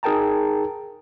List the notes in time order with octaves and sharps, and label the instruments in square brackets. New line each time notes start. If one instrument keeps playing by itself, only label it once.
[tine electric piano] D#4 G#4 A#4 G5 A5 A#5